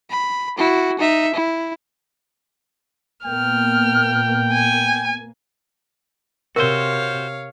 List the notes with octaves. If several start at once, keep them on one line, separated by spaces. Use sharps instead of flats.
B5
E4 F#4
D#4 E5
E4
A#2 A#3 B3 G5 F6
G#5
C3 F#4 A#4 C5 C#5 F5